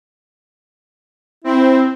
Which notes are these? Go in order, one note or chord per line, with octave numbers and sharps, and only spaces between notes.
C4 E4